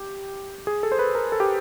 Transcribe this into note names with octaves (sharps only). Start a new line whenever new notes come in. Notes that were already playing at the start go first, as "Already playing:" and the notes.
Already playing: G4
G#4
A4
C5
B4
A#4
A4
G4